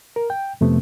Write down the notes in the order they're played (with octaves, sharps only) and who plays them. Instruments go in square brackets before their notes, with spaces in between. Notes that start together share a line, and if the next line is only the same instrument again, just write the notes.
[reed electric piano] A#4
G5
F2 C3 A3 B3